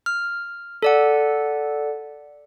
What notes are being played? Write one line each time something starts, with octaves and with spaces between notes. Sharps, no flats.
F6
A4 D5 F#5